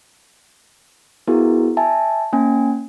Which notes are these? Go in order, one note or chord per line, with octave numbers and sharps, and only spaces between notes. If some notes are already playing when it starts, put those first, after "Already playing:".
B3 E4 F#4 G#4 A#4
E5 G#5 A5
A#3 C#4 G#5